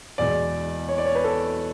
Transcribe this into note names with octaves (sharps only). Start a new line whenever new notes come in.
E2 B2 G#3 D5
C#5
D5
C#5
B4
A4